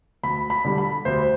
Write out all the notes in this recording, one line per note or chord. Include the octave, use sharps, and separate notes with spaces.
D2 B5
B5
D3 G3
B5
D2 C5